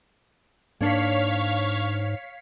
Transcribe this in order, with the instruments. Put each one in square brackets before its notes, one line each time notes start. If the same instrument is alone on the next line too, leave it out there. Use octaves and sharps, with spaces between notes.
[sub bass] G#2 [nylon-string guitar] A#3 D4 [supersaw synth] C#5 F5 B6